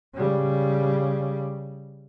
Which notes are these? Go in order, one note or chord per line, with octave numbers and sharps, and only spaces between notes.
C#3 G3